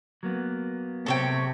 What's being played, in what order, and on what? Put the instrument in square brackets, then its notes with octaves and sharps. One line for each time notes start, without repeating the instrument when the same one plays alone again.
[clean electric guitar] F#3 A#3 B3
[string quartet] C3 [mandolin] A4 C#5 G5